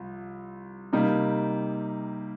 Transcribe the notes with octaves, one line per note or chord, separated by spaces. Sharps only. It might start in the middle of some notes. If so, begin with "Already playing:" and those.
Already playing: C2 F3
C3 G3 A#3 D#4